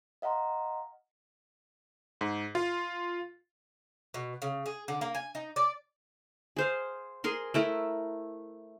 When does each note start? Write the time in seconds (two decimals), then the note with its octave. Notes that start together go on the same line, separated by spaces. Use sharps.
0.22 D#5 F5 F#5 A#5 C6
2.21 G#2
2.55 F4
4.14 B2
4.42 C#3
4.66 G#4
4.88 D3
5.01 A#3
5.15 G#5
5.35 D#4
5.56 D5
6.56 G#4 C5 F5
7.24 G#4 A#4 C6
7.54 A3 E4 A#4